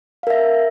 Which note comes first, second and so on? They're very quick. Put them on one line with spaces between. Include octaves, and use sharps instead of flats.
F5 A#4 E5